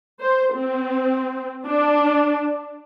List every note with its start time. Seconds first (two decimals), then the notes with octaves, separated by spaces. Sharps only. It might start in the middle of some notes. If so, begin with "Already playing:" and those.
0.21 C5
0.55 C4
1.65 D4